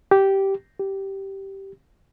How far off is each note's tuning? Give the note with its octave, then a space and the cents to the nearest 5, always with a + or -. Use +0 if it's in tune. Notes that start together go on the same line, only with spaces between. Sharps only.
G4 -10
G4 -10